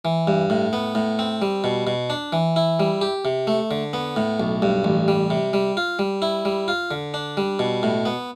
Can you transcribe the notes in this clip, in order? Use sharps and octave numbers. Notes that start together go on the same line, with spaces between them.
E3
G2
A2
B3
A2
C4
G3
B2
B2
D4
E3
E4
G3
G4
C3
A3
D3
B3
A2
B1
G2
A1
G3
C3
G3
F4
G3
E4
G3
F4
D3
D4
G3
B2
A2
B3